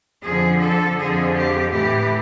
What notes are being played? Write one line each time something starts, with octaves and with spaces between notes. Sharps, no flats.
F2 D3 F3 G#4
A4
F2 D3 F3 G#4
G4
A2 E3 G4